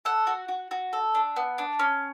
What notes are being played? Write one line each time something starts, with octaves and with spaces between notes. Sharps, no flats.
A4 F#5
F#4
F#4
F#4
A4
D4
B3
D4
C#4